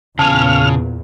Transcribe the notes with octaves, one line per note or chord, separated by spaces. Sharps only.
E2 A#2 C#3 G#5 A5 F6